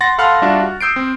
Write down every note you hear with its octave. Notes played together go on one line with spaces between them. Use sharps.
F#5 C6 A6 A#6
A4 F5 F#5 B5 C6 F6
G3 D4 F4 F#4 E5
F#4
D#6 E6 G6 C7 D7
C4